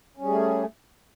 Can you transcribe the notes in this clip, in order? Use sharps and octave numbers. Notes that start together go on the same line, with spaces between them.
G3 A3 C#4 G#4